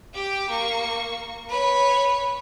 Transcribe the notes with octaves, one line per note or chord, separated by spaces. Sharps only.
G4 G5
A#3 C#6
B4 C#5